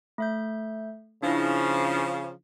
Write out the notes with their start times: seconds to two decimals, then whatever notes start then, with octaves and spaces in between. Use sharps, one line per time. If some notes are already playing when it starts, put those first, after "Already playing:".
0.18 A3 E5 G6
1.23 C#3 F3 D4 E4